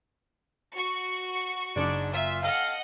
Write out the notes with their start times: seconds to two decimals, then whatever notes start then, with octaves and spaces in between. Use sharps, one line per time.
0.75 F#4 C#6
1.76 F#1 G#2 D4
2.13 A#2 F4 E5
2.42 C4 A4 D#5 F5 F#5